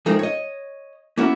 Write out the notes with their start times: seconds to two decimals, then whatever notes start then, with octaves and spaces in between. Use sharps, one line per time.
0.06 F3 G#3 A3 C4 D#4 A#4
0.19 C#5 D#5
1.17 A#3 B3 C#4 E4 F#4